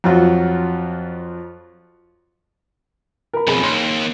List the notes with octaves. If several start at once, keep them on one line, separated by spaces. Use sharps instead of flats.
F2 F#3 F4
A#4 B5
B1 F2 G#4 B5
D#2 C6